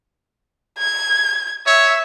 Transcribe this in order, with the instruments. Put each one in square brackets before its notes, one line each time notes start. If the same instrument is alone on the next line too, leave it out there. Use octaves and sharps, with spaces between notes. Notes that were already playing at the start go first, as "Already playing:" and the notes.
[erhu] G#6
[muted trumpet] C#5 [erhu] E5